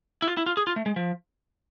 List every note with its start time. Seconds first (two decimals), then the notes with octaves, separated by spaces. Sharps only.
0.22 E4
0.28 F4
0.37 E4
0.46 F4
0.57 G#4
0.67 F4
0.76 A3
0.86 G#3
0.96 F3